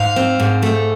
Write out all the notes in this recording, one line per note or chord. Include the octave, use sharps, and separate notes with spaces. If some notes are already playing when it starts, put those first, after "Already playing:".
Already playing: G#2 F5
C4
G#2
A3